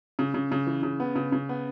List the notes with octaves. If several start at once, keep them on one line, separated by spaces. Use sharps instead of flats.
C#3
C#3
C#3
E3
C#3
B3
C#3
C#3
B3